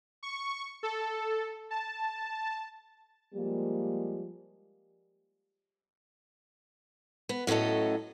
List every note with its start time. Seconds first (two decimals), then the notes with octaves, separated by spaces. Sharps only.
0.23 C#6
0.83 A4
1.71 A5
3.35 F3 G3 G#3 A#3
7.29 B3
7.47 A2 F#3 C#4 A4 D#5